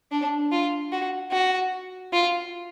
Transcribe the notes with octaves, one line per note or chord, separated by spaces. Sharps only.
D4
F4
F#4
F#4
F4